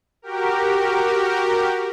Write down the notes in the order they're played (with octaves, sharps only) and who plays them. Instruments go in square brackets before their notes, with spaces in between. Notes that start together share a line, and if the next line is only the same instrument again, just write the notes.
[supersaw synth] F#4 G4 A#4